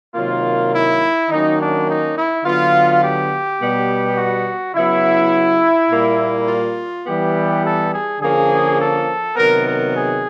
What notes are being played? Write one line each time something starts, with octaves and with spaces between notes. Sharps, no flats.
C3 D#3 F#3 A#3 F4
E4
D#3 F#3 A#3 C#4 D#4
D4
D#4
E4
D3 F#3 B3 F4
G4
B2 G3 B3
F#4
C#3 F#3 B3 E4
A#2 G3 A#3
F4
E3 G3 B3 G4
A4
G#4
D3 F3 A#3 C#4 G#4
A4
C3 D#3 F#3 B3 A#4
A#4
G#4